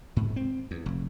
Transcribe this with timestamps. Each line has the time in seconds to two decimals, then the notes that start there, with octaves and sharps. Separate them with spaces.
0.16 G#2
0.36 C4
0.71 E2
0.86 F1